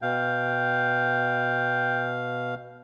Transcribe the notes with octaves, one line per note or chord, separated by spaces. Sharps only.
B2 F5 G5